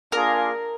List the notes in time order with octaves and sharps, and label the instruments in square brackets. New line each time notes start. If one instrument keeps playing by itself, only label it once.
[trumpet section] A#3 D4 F4 G#4 [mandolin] A#4